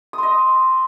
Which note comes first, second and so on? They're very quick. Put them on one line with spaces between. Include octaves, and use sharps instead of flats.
D#6 C6 D#5